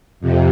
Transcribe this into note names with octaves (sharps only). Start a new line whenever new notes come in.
F2 C3